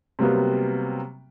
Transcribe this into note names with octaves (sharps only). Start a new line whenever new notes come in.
C3 F#3 G3 A#3 B3